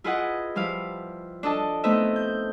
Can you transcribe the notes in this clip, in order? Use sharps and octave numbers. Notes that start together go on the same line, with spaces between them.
E4 F4 G#4 B4 D#5 F#5
F3 G3 E4 F5
D4 A4 D#5 A5
A3 B3 C4 D#4 D#5 E5
G6